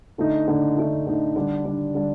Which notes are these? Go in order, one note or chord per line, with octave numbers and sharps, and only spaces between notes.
D3 A3 D#4
D3 A3 D#4
D3 A3 D#4
D3 A3 D#4
D3 G3 D4
D3 G3 D4
D3 G3 D4